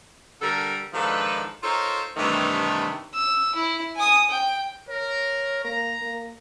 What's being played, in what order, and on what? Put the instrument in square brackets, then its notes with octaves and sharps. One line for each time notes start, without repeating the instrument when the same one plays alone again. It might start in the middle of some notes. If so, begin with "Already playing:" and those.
[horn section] D3 G3 A4 A#4
G#2 D#3 F3 D4 A4 B4
D#4 F4 A4 A#4 C5 C#5
G2 C3 D#3 E3 A3
[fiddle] E6
E4
G#5 D#6
G5
[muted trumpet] A#4 [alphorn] C#5
[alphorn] A#3 [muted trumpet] A#5
[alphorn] A#3